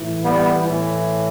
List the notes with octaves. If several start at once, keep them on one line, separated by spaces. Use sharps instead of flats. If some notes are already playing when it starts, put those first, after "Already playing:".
Already playing: A2 E3
G3 B3
A2 E3